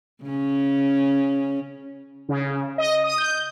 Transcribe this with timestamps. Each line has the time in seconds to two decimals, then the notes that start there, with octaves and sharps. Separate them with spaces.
0.24 C#3 C#4
2.29 C#3
2.78 D#5
3.04 D#6
3.18 G6